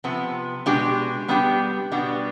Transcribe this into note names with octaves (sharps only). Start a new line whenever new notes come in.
C3 F3 B3
B2 G#3 D4 G4
G3 B3 D4 G4
B2 G3 B3 D4